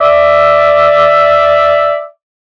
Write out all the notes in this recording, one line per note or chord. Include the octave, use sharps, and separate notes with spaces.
D5 E5